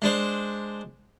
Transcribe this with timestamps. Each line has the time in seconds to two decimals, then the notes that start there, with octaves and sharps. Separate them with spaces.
0.02 G#3 D4 C5